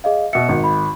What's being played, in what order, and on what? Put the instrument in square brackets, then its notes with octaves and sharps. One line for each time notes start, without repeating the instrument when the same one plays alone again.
[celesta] G#4 D#5 F5
[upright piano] B2 E5 [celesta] C#7
[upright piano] G#1
[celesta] B5